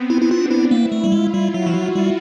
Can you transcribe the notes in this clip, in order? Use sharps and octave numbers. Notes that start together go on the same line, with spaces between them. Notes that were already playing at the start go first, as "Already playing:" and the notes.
Already playing: B3 C4
E4
E4
D4 F4
E4
A#3 E4
A3
G3
G#3 F4
G3
F#3 F#4
F3
F#3
G3